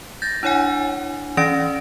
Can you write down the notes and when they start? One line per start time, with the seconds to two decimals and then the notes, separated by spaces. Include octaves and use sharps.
0.22 G6 A6 A#6
0.43 D4 E4 C#5 F#5 G#5
1.37 E3 C#4 D5 A#6 D7